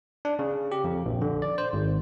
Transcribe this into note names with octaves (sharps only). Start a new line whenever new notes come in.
D4
C#3
G4
F2
A#1
D3
D5
C5
G#1